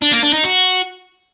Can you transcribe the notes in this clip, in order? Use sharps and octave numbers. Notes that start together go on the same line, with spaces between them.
D4
A#3
D4
D#4
F#4